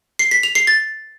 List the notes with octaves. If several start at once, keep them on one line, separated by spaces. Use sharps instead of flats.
C7
B6
F7
C7
A6